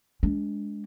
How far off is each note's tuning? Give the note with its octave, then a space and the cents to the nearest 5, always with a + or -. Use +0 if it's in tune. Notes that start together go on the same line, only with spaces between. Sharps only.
G#3 +0 D4 -25